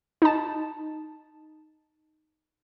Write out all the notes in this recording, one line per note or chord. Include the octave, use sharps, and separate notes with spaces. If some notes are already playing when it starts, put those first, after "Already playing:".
D#4 A5